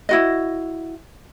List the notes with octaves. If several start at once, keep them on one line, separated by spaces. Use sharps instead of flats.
E4 F#4 D#5